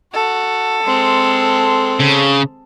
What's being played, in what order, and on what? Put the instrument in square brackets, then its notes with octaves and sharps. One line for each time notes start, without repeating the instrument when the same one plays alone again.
[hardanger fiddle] F#4 [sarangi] A4
[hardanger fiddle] G#3 C4
[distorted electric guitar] C#3